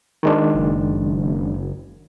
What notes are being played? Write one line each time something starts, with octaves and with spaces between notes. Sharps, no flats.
D#3 G#3 D4
F#1